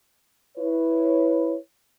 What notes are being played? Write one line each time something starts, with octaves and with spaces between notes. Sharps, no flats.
E4 B4 C#5